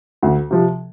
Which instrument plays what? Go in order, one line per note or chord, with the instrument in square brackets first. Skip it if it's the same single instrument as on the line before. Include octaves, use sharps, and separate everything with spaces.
[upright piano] D2
C3 F3